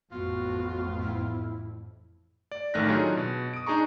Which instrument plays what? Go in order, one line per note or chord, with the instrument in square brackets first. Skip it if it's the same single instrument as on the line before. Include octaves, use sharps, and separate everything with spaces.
[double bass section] A1 F2 A2 [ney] B3 [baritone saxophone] F4 [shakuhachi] F#4
[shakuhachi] E4
[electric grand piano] D5
A1 D#3 A3 F6 F#6 A#6
F#3 D4 D#4 F4 G#4 C#5
B2
D#6 D7
D4 D#4 G#4 A#5 C#6